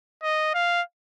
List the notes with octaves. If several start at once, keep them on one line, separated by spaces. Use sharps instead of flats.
D#5
F5